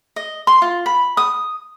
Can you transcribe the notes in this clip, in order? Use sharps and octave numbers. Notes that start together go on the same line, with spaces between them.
D#5
C6
F4
B5
D#6